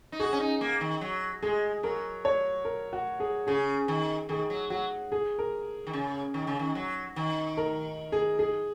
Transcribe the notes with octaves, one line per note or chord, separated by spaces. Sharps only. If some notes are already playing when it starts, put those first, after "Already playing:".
D#4
F#4 G#4
C#4
D#4
A#3
D#3
F#3
G#3 G#4
F#3 A#4
C#5
A#4
F#4
G#4
C#3 G#4
D#3
D#3 G#4
F#3
F#3 F#4
G#4
A#4
D#3
C#3
D#3
C#3
D#3
F#3
D#3
A#4
G#4
G#4